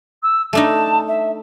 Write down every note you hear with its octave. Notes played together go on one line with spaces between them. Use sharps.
E6
A3 D4 D#4 A5
E5